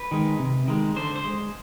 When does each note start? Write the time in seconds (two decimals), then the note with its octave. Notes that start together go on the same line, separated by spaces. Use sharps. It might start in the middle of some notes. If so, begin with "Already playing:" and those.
Already playing: B4
0.11 D#3 G#3
0.39 C3
0.68 D#3 G#3
0.96 D3 C5
1.16 C5
1.24 G#3